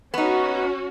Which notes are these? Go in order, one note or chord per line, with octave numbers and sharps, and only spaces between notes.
B3 C#4 D#4 F#4